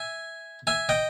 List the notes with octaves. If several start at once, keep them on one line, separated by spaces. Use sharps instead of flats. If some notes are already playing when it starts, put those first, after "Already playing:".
Already playing: E5 G#5
E5 G#5
D#5 G5